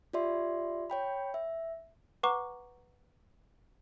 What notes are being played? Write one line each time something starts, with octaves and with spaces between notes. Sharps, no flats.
F4 G4 D5 E5 C6
C#5 G5 B5
E5
B4 F#5 A#5 C#6 D6